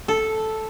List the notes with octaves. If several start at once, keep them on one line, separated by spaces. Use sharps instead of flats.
A4